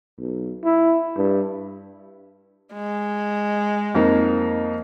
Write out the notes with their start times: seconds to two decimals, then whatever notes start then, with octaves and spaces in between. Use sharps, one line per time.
0.19 B1
0.64 E4
1.17 G2
2.73 G#3
3.95 F2 A#3 D#4